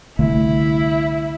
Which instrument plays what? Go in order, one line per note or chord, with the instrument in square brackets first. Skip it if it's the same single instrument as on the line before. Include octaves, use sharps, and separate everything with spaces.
[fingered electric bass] C2 D3 A3 [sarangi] E4